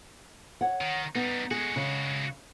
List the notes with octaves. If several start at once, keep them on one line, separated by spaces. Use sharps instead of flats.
C#5 F#5
D#3
G3 B3 D#4
G#3 F#4 G#4
C#3